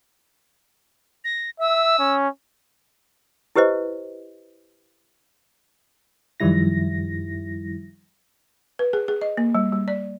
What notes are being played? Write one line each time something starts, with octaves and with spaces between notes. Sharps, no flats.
A#6
E5 E6
C#4
E4 G4 B4 C5 D#5
F#2 D#3 F3 G3 E4 A#6
B4
G#4
G#4
D#5
A#3
G3
G3
D5